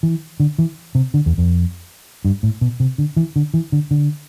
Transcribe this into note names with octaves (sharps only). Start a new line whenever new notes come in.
E3
D3
E3
C3
D3
E2
F2
G2
A2
B2
C3
D3
E3
D3
E3
D3
D3